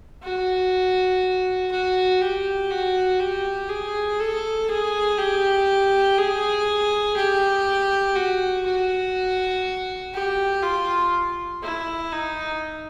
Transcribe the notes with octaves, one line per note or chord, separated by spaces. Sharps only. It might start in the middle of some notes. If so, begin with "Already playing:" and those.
F#4
F#4
G4
F#4
G4
G#4
A4
G#4
G4
G#4
G4
F#4
F#4
G4
F4
E4
D#4